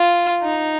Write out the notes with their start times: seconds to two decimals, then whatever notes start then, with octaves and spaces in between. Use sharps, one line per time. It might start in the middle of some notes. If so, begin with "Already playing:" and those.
Already playing: F4
0.43 D#4